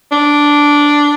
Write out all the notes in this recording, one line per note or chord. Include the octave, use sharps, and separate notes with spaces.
D4